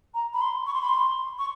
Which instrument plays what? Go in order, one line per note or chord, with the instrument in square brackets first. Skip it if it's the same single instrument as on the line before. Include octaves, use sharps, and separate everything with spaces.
[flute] A#5
B5
C6
C#6
C6
B5
C6
C#6